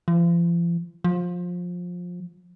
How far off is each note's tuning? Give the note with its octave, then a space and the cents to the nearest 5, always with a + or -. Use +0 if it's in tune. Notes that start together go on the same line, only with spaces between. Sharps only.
F3 -40
F3 +20